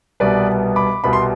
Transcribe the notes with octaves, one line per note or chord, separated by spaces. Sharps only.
C2 B2 G3 B3 B4 D5
B5 D6
C2 B2 G3 B3 B5
C6